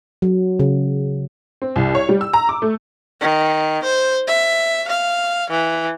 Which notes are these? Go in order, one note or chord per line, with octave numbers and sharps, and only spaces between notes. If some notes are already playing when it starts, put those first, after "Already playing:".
F#3
C#3
C4
C2
C#5
G3
E6
A#5
D6
A3
D#3
C5
E5
F5
E3